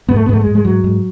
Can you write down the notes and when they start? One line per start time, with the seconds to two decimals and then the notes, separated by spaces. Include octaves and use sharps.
0.09 G#2 B3
0.16 A3
0.26 B3
0.29 G#2 A3
0.41 G#3
0.47 G#2
0.55 G#3
0.65 G#2 F#3
0.84 G#2